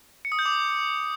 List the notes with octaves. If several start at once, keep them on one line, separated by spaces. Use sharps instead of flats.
C#7
D#6
G6
D6